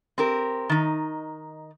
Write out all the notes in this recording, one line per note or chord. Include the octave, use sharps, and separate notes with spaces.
C4 G4 A#4
D#3 D#4